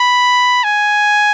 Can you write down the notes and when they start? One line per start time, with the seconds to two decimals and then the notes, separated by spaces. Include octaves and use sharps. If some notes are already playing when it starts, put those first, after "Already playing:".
Already playing: B5
0.64 G#5